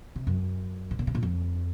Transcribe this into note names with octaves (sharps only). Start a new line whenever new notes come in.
C3
F#2
A2
A#2
B2
A#2
F2